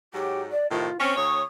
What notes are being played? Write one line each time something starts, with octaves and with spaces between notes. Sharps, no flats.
G#2 F#3 G4
D5
A2 C3 D#3 F4
C4 C#4 C5
D2 C#5 D#6